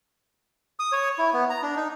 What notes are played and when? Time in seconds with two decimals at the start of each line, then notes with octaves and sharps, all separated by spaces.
0.79 D#6
0.92 C#5
1.19 E4
1.33 B3
1.50 A#5
1.63 D4
1.76 D#4